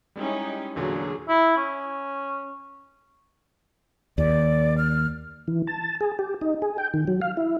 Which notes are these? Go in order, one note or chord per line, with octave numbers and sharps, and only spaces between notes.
G3 G#3 C#4 D#4 E4 G4
E2 A#2 D3 F#3 G#4
E4
C#4
D#2 D5
F6
E3
A5
G#4
G4
D#4
G#4
G5
D#3
F#3
F5
E4